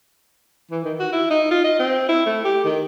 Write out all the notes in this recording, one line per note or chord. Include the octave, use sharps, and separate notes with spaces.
E3
D#3
F#4
E4
D#4
F4
D#5
C4
E4
A3
G4
D#3